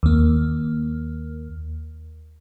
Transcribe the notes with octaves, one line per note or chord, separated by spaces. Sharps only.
D#2 A#3